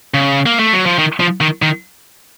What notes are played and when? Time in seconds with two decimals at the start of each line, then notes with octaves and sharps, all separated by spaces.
0.14 C#3
0.46 A#3
0.59 A3
0.72 F#3
0.86 F3
0.99 D#3
1.20 F3
1.41 D#3
1.62 D#3